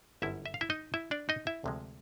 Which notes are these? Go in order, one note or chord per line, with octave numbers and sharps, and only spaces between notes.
G1 F#2 D3 G3 E4 E5
E5
F5
E4 E5
D#4 D#5
E4 E5
D4 D5
D#4 D#5
E4 E5
D2 C3 F3 G#3